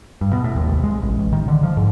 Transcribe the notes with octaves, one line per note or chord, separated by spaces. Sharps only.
G2
B2
A2
D#2
C2
G#3
A1
A1
D#3
D3
F3
G#2